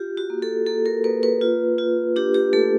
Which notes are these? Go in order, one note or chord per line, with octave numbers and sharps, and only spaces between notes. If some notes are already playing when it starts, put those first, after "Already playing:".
Already playing: F4 G4
F#4
A#3
A4
A#3 A4
A#4
A#3 B4
B4
F4
F4
D4 G4
G4
A3 A4